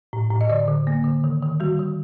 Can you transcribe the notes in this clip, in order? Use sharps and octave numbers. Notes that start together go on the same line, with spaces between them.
A2
A2
D#5
D3 D5
D3
A#3
D3
D#3
D#3
G3 F#4
D#3